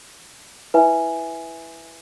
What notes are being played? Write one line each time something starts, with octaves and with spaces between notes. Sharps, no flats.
E4 B4 E5 G#5